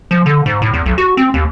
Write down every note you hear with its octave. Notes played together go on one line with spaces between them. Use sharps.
F3
D3
G#2
A2
E2
B1
F#4
C4
D#2